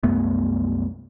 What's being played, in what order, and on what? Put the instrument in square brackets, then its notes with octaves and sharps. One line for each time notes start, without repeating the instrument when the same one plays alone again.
[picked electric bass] C2 F#2 A3 B3